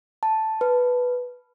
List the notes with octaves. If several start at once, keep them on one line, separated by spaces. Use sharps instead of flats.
A5
B4